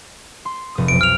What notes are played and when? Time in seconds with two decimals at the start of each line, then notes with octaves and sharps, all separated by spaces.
0.45 C6
0.75 F1 D#6
0.88 B1 F2 D7
1.01 F6 F7